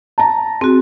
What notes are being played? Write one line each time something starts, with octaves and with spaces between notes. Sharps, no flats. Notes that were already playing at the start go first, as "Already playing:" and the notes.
A5 A#5
C4 F#4 G#4